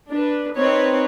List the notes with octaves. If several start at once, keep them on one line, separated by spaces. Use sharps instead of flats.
D4 B4
C4 D#4 B4 C#5